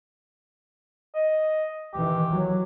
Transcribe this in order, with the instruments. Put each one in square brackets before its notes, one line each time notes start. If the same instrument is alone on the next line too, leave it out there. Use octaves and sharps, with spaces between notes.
[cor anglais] D#5
[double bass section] D#3 E3 [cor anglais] G4
[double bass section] F#3